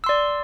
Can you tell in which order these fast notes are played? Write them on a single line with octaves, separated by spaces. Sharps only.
E6 C6 D5